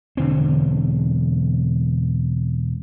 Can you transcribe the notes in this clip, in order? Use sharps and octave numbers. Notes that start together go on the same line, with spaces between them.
E1 D3 C4